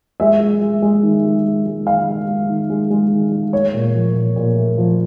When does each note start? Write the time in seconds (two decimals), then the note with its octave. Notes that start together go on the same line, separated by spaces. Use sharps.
0.20 G#3 E5
0.40 G#3
0.62 G#3
0.82 G#3
1.03 D#3
1.25 G#3
1.45 G#3
1.66 G#3
1.86 D#3 F5
2.07 G#3
2.28 G#3
2.49 D#3
2.70 G#3
2.90 G#3
3.11 D#3
3.32 G#3
3.53 A3 C#5
3.74 A#2
3.95 F3
4.15 A#2
4.36 A#2
4.56 A3
4.78 F3